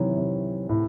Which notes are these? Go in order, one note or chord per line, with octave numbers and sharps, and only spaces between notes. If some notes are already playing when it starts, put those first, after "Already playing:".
Already playing: C3 D#3 E3 F#3
C3
A2